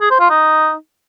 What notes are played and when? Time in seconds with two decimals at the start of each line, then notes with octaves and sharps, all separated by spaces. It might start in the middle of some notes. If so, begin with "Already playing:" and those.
0.01 G#4
0.11 C5
0.20 F4
0.30 D#4